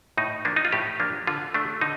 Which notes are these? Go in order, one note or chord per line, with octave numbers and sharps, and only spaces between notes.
A2 D#4
F3 A#3 D4
D#4
F4
A2 G4
F3 A#3 D4
D3 F4
A3 D4
D3 D#4